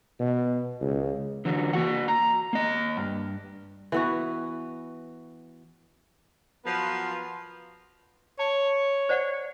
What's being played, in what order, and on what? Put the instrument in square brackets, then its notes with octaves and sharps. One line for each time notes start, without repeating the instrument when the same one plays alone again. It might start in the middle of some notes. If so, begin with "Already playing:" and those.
[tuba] B2
C#2
[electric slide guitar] D3 E3 F#3
A#3 F#4 F#5
A#5
A#3 D#5
G2
[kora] E3 B3 F#4
[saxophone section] F3 F#3 B3 F4 A#4 B4
[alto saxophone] C#5 [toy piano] A5
[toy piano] C5 D5 F#5